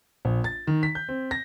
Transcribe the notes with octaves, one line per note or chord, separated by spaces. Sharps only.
A#1
A6
D#3
B6
G6
C4
A#6